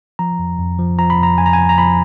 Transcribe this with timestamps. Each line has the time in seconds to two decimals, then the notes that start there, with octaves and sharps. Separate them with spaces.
0.19 F3 A#5
0.39 F2
0.58 F2
0.79 F3
0.98 F3 A#5
1.10 B5
1.18 F2 A#5
1.38 F2 G#5
1.46 A#5
1.53 F3 G#5
1.69 A#5
1.78 F3 B5